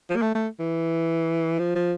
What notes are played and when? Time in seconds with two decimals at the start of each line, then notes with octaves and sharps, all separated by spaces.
0.10 F3
0.16 A#3
0.22 A3
0.35 A3
0.59 E3
1.59 F3
1.75 F3